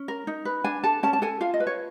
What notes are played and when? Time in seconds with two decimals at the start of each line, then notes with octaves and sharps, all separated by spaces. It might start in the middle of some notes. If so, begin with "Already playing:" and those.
Already playing: C#4
0.08 A#4
0.27 D#4
0.45 B4
0.64 D4 G#5
0.84 A4 A5
1.03 C#4 A5
1.13 A5
1.22 A4 G#5
1.41 F4 F5
1.54 D#5
1.60 B4
1.67 C#5